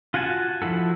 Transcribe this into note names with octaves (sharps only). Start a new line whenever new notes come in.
F4 F#4 F#5 G#5 A5
F3 E4 F#4 A4